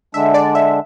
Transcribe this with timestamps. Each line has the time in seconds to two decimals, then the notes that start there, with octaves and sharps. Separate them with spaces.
0.14 D3 G#3 D4 E5
0.34 D5
0.55 E5